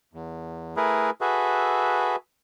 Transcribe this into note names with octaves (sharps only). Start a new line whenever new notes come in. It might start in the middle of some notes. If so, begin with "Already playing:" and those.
E2
A3 E4 G#4 A#4 B4
F#4 G#4 A4 B4 E5